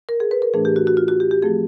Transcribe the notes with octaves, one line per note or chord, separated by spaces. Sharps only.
A#4
G#4
B4
A#4
A2 E3 A3 D4 G#4
G4
F#4
F#4
F4
F#4
G4
G4
F3 A3 C4 G#4